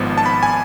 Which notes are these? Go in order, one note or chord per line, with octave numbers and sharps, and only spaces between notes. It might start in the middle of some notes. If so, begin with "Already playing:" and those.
Already playing: G#1 G#2 F3 B3
A5
B5
G#5